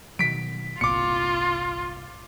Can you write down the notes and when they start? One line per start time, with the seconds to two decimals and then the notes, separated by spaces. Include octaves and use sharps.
0.19 B2 D#3 F#3 B6 D7
0.81 G1 C2 A#2 F4 D6 C#7